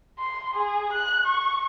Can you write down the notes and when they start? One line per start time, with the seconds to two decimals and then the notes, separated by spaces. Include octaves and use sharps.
0.19 C6
0.55 G#4
0.93 F#6
1.26 C#6